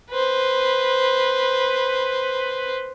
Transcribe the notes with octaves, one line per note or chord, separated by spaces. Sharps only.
B4 C5